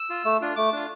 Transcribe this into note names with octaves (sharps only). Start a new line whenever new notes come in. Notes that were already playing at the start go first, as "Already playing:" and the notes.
Already playing: E6
F4
A3
D4 F4
A3 D6
D4 F4